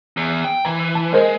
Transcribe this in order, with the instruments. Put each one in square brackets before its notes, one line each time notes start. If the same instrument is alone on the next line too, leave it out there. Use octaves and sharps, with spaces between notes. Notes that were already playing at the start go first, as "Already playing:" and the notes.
[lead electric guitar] E2
G5
[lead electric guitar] E3 [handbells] A#5
[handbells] A5
[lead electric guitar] G#3 [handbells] A#4 C5 D#5